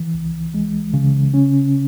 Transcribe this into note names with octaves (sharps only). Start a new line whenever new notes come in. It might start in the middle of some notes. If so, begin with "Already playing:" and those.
Already playing: E3
C#2
G#3
C#3
C#4